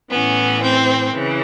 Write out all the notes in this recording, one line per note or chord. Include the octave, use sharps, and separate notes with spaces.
A2 E3 B3 C#4
C4
C#3 E3